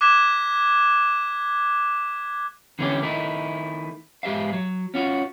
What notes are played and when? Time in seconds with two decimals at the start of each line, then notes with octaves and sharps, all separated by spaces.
0.01 D6 F#6 G#6 B6 E7
2.79 D3 E3 A3 C#4 F#4 G4
3.02 D#3 A3 D#4 E4
4.23 G#2 G#3 G4 E5 F5
4.53 F#3
4.94 C#4 F4 F#4